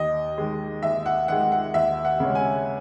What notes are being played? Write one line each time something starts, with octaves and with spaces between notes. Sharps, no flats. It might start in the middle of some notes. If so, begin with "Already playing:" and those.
Already playing: D#2 D#5
D#3 G#3
D#2 E5
F#5
D#3 G#3 F#5
F#5
D#2 E5
F#5
C#3 G#3 C#4
G#5